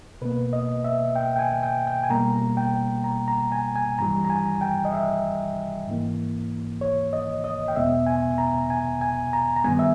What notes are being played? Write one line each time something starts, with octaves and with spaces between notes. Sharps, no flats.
B2 A#3 B4
D#5
E5
G5
G5
G#5
G5
G5
G#5
B2 G3 A#3 A#5
G5
A#5
A#5
G#5
G#5
G2 E3 G3 A#5
A#5
G#5
G5
D#5
E5
G#2 E3 A#3
C#5
D#5
D#5
G5
E2 B2 G#3 B3 E5
G#5
A#5
G#5
G#5
A#5
A#5
G2 D#3 G3 B3 G#5
E5